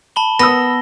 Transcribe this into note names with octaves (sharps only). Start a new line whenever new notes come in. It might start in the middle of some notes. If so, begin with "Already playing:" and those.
A5 B5 G7
B3 B5 D#6 E6 A#6